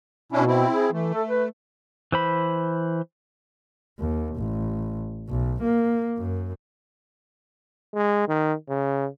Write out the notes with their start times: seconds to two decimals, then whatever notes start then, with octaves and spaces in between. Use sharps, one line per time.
0.32 B2 C#4 D4 E4
0.47 C4 E4
0.72 G#4
0.93 E3 A3
1.14 A4
1.28 B4
2.12 E3 C5 B5
3.99 D#2
4.36 A1
5.29 B1
5.62 A#3
6.18 F#2
7.94 G#3
8.28 D#3
8.69 C#3